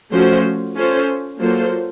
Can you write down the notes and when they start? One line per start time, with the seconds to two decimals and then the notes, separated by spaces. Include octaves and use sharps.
0.12 F3 A3 C#4 F#4 C5
0.76 C#4 F4 A4 C5
1.40 F#3 A#3 F4 A4 C5